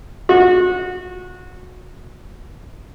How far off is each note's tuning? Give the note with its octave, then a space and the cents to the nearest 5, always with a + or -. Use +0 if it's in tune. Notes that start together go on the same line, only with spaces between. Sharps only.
F#4 -25